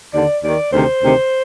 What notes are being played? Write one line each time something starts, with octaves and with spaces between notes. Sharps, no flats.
D#2 D3 D5
D#2 D#3 D5
D2 C3 D#3 C5
D2 C3 D#3